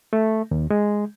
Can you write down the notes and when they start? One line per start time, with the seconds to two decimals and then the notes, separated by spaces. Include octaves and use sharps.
0.13 A3
0.51 D#2
0.70 G#3